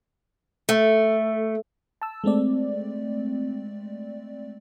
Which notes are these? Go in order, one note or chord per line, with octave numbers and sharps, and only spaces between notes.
A3
A5 E6
G#3 A3 C4 D5